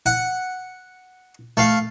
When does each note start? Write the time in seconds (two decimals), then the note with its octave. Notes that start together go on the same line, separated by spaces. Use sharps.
0.06 F#5
1.57 A3 F5